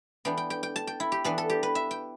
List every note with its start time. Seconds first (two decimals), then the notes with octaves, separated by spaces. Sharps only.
0.25 E3 B3 D4 G5
0.38 G5
0.50 G5
0.63 G5
0.76 A5
0.87 G5
1.00 E4
1.12 G4
1.24 E3 B3 D4 B4
1.38 A4
1.50 G4
1.63 B4
1.75 E5
1.91 G5